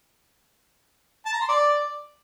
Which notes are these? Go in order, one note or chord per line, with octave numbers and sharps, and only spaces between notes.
A5
A#5
C6
D5